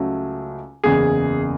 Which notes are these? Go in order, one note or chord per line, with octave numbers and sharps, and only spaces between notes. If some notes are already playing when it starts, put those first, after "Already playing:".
Already playing: C#2 C#3 F#3 A3
F#1 E2 C#3 G#4